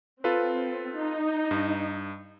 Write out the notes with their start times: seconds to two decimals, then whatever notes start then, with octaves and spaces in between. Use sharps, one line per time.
0.24 C4 F4 A4 B4
0.96 D#4
1.51 G2